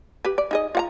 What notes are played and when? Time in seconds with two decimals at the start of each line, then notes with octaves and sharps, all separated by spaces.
0.25 G4 B4
0.38 D5
0.51 D#4 G#4 D#5
0.75 F4 F#5 A#5